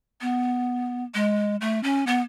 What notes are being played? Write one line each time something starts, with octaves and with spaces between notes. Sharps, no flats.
B3
G#3
A3
C#4
B3